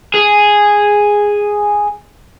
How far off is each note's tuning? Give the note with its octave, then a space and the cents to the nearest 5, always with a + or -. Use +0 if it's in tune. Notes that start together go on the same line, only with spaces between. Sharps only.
G#4 -5